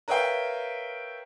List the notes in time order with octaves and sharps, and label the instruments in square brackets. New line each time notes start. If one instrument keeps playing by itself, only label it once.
[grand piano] A#4 B4 C#5 E5 F5 G5